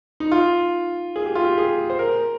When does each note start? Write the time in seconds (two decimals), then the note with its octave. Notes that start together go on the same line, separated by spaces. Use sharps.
0.20 D#4
0.32 F4
1.16 G#4
1.26 G4
1.35 F4
1.45 G4
1.58 G#4
1.90 C5
1.99 A#4